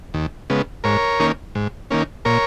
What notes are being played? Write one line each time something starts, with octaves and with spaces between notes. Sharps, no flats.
D#2
C#3 G#3 B3
G#2 A#4 C#5
D#3 A#3 C#4
G#2
D#3 A#3 C#4
A#2 A#4 C#5